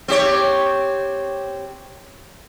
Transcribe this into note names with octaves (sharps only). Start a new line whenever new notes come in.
C4 G4 C#5